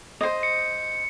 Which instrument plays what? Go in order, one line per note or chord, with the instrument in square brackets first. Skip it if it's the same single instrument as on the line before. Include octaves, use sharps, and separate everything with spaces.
[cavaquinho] C5 D#5
[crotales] C#7